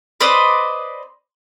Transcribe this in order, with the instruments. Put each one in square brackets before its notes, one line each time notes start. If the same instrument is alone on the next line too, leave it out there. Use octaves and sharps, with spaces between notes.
[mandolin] B4 C5 D5 D#5